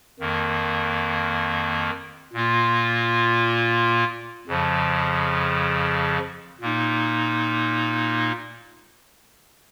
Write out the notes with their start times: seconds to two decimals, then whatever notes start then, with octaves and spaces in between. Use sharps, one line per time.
0.20 F2 D#3 A#3
2.33 A#2 A#3 F4
4.47 F2 C#3 F3
6.61 A#2 A#3 D#4